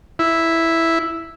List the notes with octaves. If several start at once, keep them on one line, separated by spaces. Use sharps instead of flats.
E4